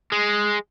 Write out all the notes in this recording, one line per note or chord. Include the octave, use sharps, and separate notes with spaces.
G#3